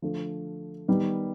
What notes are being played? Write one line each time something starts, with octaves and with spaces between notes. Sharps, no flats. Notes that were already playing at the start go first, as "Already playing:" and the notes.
D3 F3 A3
D#3 G3 B3 D#4